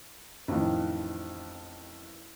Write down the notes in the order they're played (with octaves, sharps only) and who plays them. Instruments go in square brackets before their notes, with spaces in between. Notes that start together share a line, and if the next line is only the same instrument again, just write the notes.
[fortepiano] A1 F2 D#3